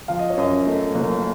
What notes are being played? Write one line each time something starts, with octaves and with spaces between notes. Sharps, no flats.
F3 F5
D#5
C#5
F#2 D#5
A3
F#1